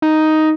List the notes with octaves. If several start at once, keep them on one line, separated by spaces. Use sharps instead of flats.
D#4